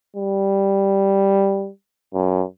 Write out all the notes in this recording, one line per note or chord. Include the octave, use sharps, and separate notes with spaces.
G3
F#2